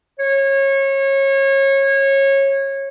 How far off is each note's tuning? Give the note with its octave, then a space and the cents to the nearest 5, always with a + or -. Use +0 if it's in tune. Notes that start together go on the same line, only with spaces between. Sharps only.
C#5 -25